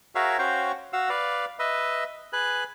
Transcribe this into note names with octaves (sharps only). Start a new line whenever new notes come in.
F#4 G#4 A#4 C#5 E5 F5
C#4 F#4 C5 F5 G5 C#6
F#4 F5 F#5 E6
B4 D5 F5
B4 D#5 E5
G#4 B4 F#6